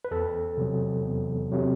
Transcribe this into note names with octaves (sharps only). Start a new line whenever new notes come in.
B4
E2 A4
C3 F#3
E2
C3 F#3